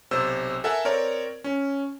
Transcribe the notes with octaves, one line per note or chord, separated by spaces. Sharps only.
B1 C3 C5 E6
A4 A#4 E5 F#5 G#5
C4 A#4 C#5 D5
C#4